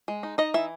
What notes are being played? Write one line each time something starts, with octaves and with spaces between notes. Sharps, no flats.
G#3
D#4
D#4 D#5
E3 E5